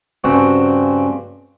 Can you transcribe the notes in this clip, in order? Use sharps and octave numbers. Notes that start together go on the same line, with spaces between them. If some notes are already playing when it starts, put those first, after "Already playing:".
G2 C#3 C4 F#4